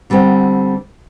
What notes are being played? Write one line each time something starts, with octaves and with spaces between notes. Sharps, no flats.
D3 G3 B3 C4